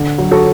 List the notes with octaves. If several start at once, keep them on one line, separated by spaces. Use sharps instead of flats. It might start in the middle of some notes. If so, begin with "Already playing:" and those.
Already playing: D3
F#3
F#4 A4